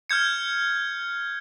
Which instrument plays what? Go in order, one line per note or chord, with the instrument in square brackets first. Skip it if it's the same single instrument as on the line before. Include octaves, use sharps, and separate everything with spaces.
[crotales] F6 G6 G#6 C#7